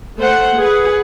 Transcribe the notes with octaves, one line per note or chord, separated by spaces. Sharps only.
A3 C5 F#5
G#4 B4 F#5